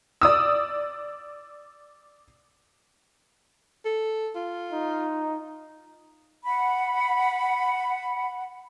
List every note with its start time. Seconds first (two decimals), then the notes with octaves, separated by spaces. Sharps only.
0.21 D5 D#6 E6
3.85 A4
4.35 F4
4.72 D#4
6.46 F#5 B5